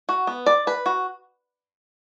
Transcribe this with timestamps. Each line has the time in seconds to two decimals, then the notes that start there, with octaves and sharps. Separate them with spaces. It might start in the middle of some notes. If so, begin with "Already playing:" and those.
0.09 F#4
0.27 B3
0.46 D5
0.67 B4
0.86 F#4